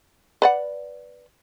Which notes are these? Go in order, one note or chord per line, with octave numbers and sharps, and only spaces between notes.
B4 D5 F#5